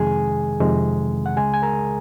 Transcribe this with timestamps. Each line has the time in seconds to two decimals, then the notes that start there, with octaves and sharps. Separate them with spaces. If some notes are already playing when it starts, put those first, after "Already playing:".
Already playing: F2 C3 D#3 G#3 G#4 G#5
0.60 F2 C3 D#3 G#3
1.26 F#5
1.37 C#2 C#3 G#3 G#4 G#5
1.54 G#5
1.62 A#4 A#5